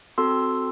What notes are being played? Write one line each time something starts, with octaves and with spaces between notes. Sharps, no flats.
C4 F#4 A4 C6 E6